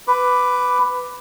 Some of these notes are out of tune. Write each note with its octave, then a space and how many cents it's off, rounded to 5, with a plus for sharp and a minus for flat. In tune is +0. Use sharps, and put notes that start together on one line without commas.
B4 +10 D6 +0